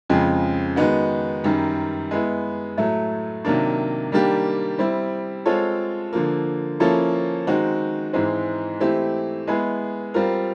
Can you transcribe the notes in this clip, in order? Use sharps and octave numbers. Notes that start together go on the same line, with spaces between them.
F2 C#3 F3 G#3
D#3 G#3 B3 D#4 F#4
F#2 D#3 G3
G#3 B3 E4
A2 F#3 A3
C3 D#3 F#3 A#3 D4
D#3 G3 A#3 D4 G4
G3 C4 E4
G#3 C4 F4 A4 C#5
D3 F3 A#3
F3 A#3 C#4 E4 A4
D#3 G#3 C4 D#4 F#4
G#2 E3 G#3 C4
E3 A3 C4 E4 G4
G#3 B3 E4 G#4
G3 C4 F4 A#4